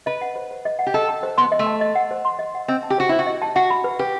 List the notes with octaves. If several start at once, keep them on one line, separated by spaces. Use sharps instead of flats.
B4 D#5
F#5
C5
C5
D#5
F#5
G4
A4 D#5
A5
C5
B3 C6
D#5
A3
A5
D#5
F#5
C5
C6
D#5
F#5
C4 D#5
A5
G4
F#4 C5
E4 C5
F#4
D#5
A5
F#4 F#5
B5
B4
G4 B4